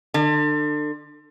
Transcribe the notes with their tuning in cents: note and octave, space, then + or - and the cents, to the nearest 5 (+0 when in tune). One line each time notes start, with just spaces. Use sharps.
D3 +30